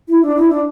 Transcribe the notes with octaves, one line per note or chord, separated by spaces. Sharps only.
E4
D4
E4
D4